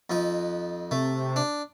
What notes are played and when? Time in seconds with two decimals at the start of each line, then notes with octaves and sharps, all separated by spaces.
0.10 F2 D#4
0.91 C3 A3
1.36 D4